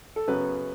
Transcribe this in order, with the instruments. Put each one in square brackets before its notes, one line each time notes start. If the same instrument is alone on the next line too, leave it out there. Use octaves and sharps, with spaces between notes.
[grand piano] A4
[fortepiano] F#2 C#3 F#3 B3 [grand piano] B4